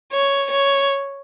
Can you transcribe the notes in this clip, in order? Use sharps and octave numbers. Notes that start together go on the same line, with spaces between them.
C#5
C#5